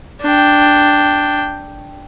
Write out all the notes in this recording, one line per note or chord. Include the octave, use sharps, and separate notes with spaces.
D4 G5